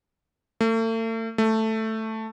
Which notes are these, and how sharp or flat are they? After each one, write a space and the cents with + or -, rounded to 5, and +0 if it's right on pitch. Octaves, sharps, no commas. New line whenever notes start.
A3 +40
A3 +5